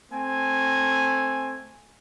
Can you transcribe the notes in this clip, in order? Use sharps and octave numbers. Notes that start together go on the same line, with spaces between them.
A3 C4 G#5